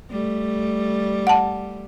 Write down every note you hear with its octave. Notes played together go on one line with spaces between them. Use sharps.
G3 A3
F#5 A5